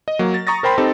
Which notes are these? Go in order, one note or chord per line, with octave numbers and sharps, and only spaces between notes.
D#5
F#3 A#3
A6
A#5 C#6 D#6 A6 A#6
A#4 C5 G5 B5 C6
C4 D#4 G4 A4